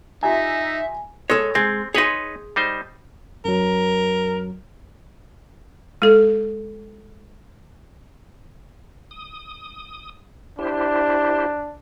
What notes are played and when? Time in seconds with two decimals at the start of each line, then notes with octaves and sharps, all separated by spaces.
0.23 D#4 F4 G4 E5 G#5 A#5
1.30 G#3 A4 C#5
1.55 G#3 C4
1.94 D#4 G#4 B4 C#5 C6
2.56 G3 D#4 C5
3.45 F#2 F#3 A#4
6.02 G#3 A4
9.11 D#6
10.59 D4 E4 G4 C5